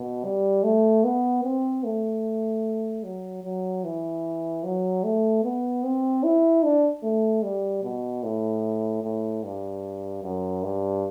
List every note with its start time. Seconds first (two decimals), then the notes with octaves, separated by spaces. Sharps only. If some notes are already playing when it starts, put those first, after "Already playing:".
Already playing: B2
0.24 G3
0.63 A3
1.04 B3
1.44 C4
1.84 A3
3.03 F#3
3.43 F#3
3.84 E3
4.64 F#3
5.04 A3
5.43 B3
5.84 C4
6.23 E4
6.63 D4
7.03 A3
7.43 G3
7.83 B2
8.23 A2
9.03 A2
9.43 G2
10.23 F#2
10.63 G2